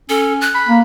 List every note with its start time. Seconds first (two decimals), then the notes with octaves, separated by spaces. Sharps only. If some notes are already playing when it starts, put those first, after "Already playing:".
0.09 C#4 A4
0.41 F#6
0.54 B5
0.68 A#3